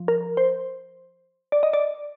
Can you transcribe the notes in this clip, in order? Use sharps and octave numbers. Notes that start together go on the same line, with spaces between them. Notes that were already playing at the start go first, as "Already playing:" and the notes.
Already playing: F3
A#4
C5
D5
D#5
D5